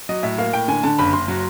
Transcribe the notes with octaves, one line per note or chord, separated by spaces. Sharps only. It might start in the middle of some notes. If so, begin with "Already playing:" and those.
F#3 D#5
A2 E5
A#3 F5
A2 G5
D3 G#5
D3 A5
F#1 B5
F#1 C6
F#3